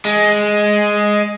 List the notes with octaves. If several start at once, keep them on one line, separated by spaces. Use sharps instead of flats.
G#3